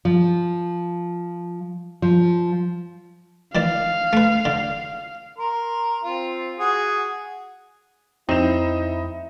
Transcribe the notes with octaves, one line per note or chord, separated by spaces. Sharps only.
F3
F3
D#3 E3 D5 F5
A3 B4
D3
A#4 C6
C4 F4
F#4 G#4
F2 C4 D#4 E4 E7